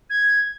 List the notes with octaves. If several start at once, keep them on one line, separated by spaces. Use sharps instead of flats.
G#6